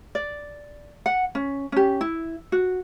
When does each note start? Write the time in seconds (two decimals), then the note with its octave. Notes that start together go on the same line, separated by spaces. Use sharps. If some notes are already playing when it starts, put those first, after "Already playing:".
0.15 D5
1.06 F#5
1.35 C#4
1.72 C#4 G4
2.01 E4
2.52 F#4